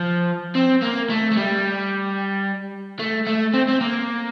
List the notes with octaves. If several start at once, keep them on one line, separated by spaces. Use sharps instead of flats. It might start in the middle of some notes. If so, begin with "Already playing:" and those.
Already playing: F3
C4
A#3
A3
A3
G3
A3
A3
C4
C4
A#3